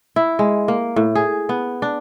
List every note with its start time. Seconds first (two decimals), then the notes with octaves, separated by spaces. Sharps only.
0.16 E4
0.39 G#3
0.68 A#3
0.96 A2
1.15 G#4
1.49 B3
1.82 D4